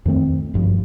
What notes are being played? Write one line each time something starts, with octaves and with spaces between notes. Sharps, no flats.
F2 D#3 A3 C4
G#1 G2 F3